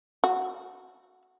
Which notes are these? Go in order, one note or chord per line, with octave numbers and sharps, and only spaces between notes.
F#4